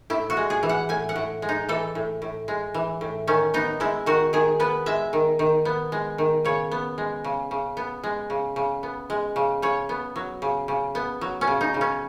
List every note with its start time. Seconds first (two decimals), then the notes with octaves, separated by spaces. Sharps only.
0.10 A2 E4
0.30 F#4
0.37 G#3
0.50 G#4
0.63 E3
0.69 F#5
0.89 A2 G#5
1.09 F#5
1.16 A2
1.42 G#3
1.49 D#4
1.69 E3 A4
1.95 A2
2.22 A2
2.48 G#3
2.74 E3
3.01 A2
3.27 D#3 C#4
3.54 B3 D#4
3.80 G#3 E4
4.06 D#3 F#4
4.33 D#3 G#4
4.60 B3 B4
4.86 G#3 E5
5.13 D#3
5.39 D#3
5.65 B3
5.92 G#3
6.18 D#3
6.45 C#3 C#5
6.71 B3
6.98 G#3
7.24 C#3
7.51 C#3
7.77 B3
8.04 G#3
8.30 C#3
8.56 C#3
8.83 B3
9.10 G#3
9.36 C#3
9.62 C#3 C#5
9.89 B3
10.16 F#3
10.42 C#3
10.68 C#3
10.95 B3
11.21 F#3
11.41 C#4
11.47 C#3
11.61 D#4
11.74 C#3
11.81 C#4